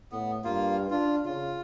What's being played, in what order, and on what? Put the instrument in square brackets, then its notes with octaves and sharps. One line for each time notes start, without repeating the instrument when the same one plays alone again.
[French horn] A2 [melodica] B3
[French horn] G2 [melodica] A#3 F4
[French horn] D4 [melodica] F4
[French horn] C#3 [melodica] F4